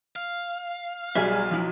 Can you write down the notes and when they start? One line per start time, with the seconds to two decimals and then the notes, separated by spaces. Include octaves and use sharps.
0.16 F5
1.15 B1 F#3 G3 G#4 E5 G#5
1.51 F3 E4